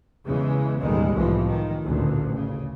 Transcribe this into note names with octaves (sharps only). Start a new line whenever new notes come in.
E2 C#3 E3 G#3
A1 D#2 B2 D#3 G3 G#3
C2 A2 E3 F3
D#3
A1 D2 A#2
C#3